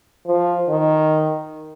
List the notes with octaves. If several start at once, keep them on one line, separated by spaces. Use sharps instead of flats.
F3
D#3